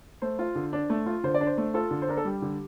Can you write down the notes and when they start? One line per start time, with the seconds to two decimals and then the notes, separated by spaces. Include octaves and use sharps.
0.22 A3 C5
0.39 F4
0.55 D3
0.73 D4
0.90 A3
1.06 F4
1.24 D3 C5
1.34 D5
1.41 D4
1.47 C5
1.58 A3
1.74 F4 A4
1.91 D3
2.02 C5
2.08 D4 A#4
2.17 A4
2.25 G3 G4
2.42 D3